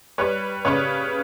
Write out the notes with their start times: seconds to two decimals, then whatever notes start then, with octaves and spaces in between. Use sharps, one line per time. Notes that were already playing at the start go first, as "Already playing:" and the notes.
0.18 G3 B4 C#5
0.65 C#3 B4 C#5